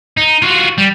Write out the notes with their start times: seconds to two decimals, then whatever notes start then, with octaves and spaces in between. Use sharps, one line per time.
0.17 D#4
0.42 F4 F#4
0.78 G3